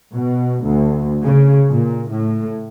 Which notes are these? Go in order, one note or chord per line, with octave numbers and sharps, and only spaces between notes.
B2
D2
C#3
A#2
A2